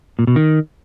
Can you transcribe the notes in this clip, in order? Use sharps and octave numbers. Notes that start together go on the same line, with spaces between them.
A#2
B2
D#3